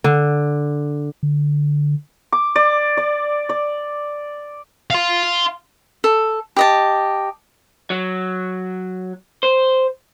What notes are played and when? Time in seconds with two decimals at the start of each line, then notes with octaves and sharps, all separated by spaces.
0.04 D3
1.23 D3
2.32 D6
2.56 D5
2.97 D5
3.49 D5
4.90 F5 C6
6.04 A4
6.56 G4 D#5 A5
7.90 F#3
9.43 C5